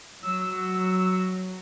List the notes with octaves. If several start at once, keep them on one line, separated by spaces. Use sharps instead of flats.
F#3 E6